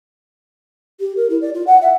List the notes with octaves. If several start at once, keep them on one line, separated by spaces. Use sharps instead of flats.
G4
A#4
E4
D5
F4
F#5
E5